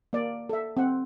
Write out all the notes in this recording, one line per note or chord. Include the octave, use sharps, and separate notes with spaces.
A#3 D5
A4 E5
C4 F#5